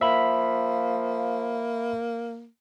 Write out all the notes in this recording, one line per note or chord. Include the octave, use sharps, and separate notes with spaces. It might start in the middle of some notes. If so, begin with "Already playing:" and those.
F3 A#3 E5 B5